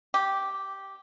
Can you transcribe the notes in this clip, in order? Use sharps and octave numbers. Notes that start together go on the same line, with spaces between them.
G4